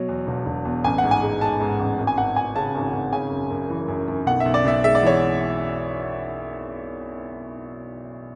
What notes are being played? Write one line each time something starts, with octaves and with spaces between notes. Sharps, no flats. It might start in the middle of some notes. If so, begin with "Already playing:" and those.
Already playing: B2 F#3
E2
E1
E1
E2
A1 G#5
F#5
G#2
G#5
G#3
G#3 A5
G#2
A1
G#1
G#5
G#1 F#5
G#1 G#5
C#3 A5
G#1
G#1
C#3 G#5
F#2
F#2
E3
F#2
F#2
B1 F#5
E5
B1
D5
B1 E5
G#3 E5
D5
E3 C#5